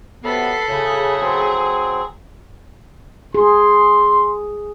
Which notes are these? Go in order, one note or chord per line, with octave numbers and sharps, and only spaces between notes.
C3 F#3 B3 A4 B4 B5 C7
F#2 A2 C#3 G#4
F#3 C4
G#4 C6